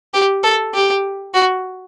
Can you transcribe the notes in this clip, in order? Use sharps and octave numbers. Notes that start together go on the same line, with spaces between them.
G4
A4
G4
F#4